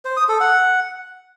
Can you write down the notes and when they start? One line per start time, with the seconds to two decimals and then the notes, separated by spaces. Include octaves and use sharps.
0.05 C5
0.17 D#6
0.29 A4
0.40 F#5